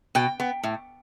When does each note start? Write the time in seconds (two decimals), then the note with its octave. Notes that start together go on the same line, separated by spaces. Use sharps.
0.15 B2 G5
0.40 B3
0.63 A2